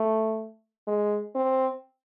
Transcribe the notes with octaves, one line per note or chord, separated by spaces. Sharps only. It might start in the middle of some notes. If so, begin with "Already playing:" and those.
Already playing: A3
G#3
C4